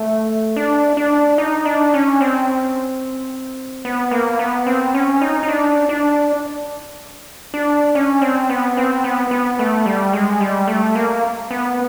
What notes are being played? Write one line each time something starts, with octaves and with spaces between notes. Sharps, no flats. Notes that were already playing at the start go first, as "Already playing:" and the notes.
Already playing: A3
D4
D4
D#4
D4
C#4
C4
B3
A#3
B3
C4
C#4
D#4
D#4
D4
D4
D4
C#4
C4
B3
C4
B3
B3
A3
G3
G#3
G3
A3
A#3
B3